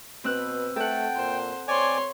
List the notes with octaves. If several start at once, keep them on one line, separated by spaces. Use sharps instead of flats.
B2 C4 B4 E6 F#6
A3 A4 F#5 G5
A#2 C5
C4 C#5 D5 G#5 C6